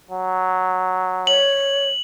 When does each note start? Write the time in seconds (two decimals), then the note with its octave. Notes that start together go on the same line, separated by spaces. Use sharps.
0.11 F#3
1.27 C#5 F#7